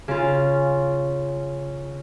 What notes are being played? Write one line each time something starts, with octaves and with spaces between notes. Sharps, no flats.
C#3 F4